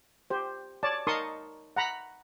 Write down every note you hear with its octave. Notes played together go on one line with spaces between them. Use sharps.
G4 C5
C#5 D5 A5
D#4 A#4 A5 C6 C#6 D#6
F#5 A#5 B5